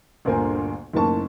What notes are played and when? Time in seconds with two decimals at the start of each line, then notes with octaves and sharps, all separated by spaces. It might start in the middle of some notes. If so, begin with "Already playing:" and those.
0.25 G1 D2 A#2 A#4 C5 G#5
0.93 F#1 B1 A2 A#3 A5 C#6